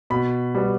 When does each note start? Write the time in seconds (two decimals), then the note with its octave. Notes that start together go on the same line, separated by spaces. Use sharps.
0.10 B2 B5
0.55 G3 B3